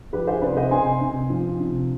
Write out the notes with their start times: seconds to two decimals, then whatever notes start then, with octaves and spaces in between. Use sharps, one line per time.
0.13 F3 G4 B4
0.27 G#4 C5
0.42 C3 B4 D5
0.57 C5 D#5
0.71 C3 G#5 C6
1.01 C3
1.30 F3
1.59 C3